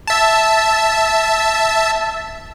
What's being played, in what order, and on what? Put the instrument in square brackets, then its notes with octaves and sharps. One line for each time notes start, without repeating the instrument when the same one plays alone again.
[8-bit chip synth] E5 A5